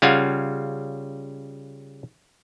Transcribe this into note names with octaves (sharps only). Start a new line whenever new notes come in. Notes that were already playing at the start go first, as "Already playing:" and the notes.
C#3 G3 F4 F5 F#5 G#5